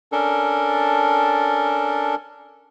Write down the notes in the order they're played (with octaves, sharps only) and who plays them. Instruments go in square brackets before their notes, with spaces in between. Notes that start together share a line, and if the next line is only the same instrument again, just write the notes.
[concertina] C#4 D4 A4 A#4